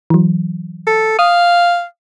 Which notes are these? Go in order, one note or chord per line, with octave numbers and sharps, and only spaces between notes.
E3 F#3
A4
F5 D#6